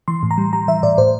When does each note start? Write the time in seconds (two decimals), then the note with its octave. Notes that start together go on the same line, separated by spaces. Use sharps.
0.08 E3 C6
0.23 A2
0.31 A#5
0.38 G3
0.53 G3 A#5
0.68 E3 E5
0.83 A2 D5
0.98 A2 C5